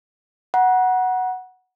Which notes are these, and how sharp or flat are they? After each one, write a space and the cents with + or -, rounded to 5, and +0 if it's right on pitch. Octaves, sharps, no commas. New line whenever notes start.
F#5 +0 A#5 +40